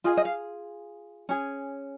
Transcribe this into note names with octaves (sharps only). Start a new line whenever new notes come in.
F4 G#4 D#5
D#5
F5
C#4 G#4